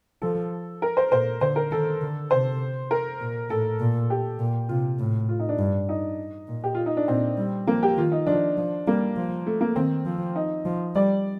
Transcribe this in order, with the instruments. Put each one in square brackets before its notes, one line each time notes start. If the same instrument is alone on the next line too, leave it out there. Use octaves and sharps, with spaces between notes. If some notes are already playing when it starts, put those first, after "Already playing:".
[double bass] F3 [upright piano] A4
[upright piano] A#4
C5
[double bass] A#2 [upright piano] C5
[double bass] D3 [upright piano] C5
[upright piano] A#4
[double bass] D#3 [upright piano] A4
[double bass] D3
[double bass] C3 [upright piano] C5
[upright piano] A#4
[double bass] A#2
[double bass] A2 [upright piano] A4
[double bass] A#2
[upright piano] G4
[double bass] A#2
[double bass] C3 [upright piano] F4
[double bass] A2
[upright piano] F4
D#4
D4
[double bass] G2
[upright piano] D#4
[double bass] A#2
[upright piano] G4
F4
D#4
D4
[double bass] A#2 [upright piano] C4
[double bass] G3
[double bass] F3 [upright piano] A#3
[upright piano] G4
[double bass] D#3 [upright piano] F4
[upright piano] D#4
[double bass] F3 [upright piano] D4
[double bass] F3
[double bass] G3 [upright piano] A#3
[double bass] F3
[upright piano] A3
A#3
[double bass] D#3 [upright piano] C4
[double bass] F3
[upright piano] D#4
[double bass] F3
[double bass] G3 [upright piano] D5